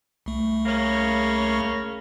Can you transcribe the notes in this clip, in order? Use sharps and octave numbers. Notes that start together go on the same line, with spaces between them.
C2 A3
C#3 A#3 C#4